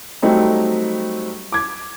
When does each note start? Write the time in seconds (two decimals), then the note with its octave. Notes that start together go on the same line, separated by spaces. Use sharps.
0.22 F#3 G3 A3 C4 D#4
1.52 D6 G#6